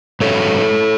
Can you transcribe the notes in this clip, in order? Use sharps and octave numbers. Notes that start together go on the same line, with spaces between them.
G#2 F#3 C#4 A4 C#5